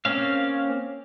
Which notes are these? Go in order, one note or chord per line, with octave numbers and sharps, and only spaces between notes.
A#3 C4 C#4 F5